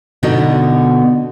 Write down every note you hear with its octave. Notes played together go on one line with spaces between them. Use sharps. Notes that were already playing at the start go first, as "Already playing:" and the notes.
B2 D3 B3 D#4 F#4